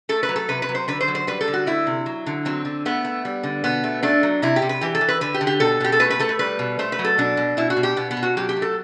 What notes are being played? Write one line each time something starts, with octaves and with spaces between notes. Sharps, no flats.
A3 A4
B4
F#3
A4
C3 B4
B4
F#3
C5
D3 B4
C5
F#3
C5
G3 B4
A4
D3
F#4
A3 E4
C3
F#3
D3
F#3 C4
D3
A3 B3
A3
G3
D3
B2 B3
A3
A3 D4
F#3
C3 E4
G4
C3
B4
E3 G4
A4
E3
B4
D3 B4
G4
D3
G4
B2 A4
B2 G4
A4
A3 B4
B4
A3 A4
B4
G3 B4
B2
A3 C5
B4
F#3
A4
B2 D4
B2
B2 E4
F#4
B2
G4
B2 B3
B3
B2
F#4
F#3 G4
G4
A3
A4